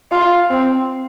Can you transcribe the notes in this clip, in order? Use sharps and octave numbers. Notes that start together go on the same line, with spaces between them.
F4
C4